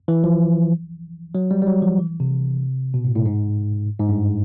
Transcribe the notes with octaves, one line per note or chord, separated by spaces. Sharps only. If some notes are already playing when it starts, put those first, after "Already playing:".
E3
F3
F#3
G3
G3
F#3
F3
E3
C3
B2
A2
A2
G#2
G#2
G2